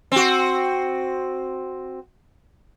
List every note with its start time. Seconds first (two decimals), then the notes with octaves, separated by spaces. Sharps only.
0.12 C4 F#4